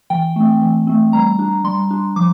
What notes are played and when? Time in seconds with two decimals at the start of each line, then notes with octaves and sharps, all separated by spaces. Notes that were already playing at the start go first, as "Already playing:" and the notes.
0.10 E3 G5
0.36 A3 C4
0.62 E3
0.87 A3 C4
1.13 G3 A#5
1.39 D4
1.64 G3 C6
1.91 D4
2.16 F3 D6